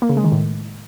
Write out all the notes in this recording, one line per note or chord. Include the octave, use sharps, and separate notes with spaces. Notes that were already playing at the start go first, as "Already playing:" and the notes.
A#3
C#3
G#3
D#3
A2